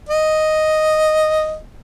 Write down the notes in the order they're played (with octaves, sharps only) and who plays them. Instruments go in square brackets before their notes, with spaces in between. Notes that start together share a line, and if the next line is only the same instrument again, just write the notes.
[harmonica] D#5